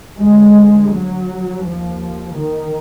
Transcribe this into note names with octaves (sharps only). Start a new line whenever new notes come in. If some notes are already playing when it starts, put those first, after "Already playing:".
D2 G#3
F#3
D#2 F3
D#3